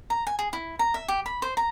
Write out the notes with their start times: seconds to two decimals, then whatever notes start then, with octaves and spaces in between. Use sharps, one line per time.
0.10 A#5
0.27 G#5
0.39 G#4
0.53 E4
0.79 A#5
0.94 E5
1.08 G4
1.26 B5
1.42 C5
1.57 A#5